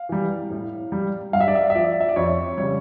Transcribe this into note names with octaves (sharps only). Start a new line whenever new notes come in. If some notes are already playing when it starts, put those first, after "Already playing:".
Already playing: F5
E3 G3
A2
G3
G2 F5
E5
D5
E5
E5
F3 D5
E5
D5
F2 C#5
C#3 G3 C#5